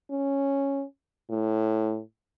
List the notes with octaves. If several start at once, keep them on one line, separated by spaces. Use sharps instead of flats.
C#4
A2